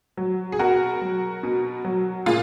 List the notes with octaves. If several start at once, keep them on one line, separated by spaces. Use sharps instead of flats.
F#3
G#4
B2 F#4 A#4
F#3
B2
F#3
A#2 F4 G#4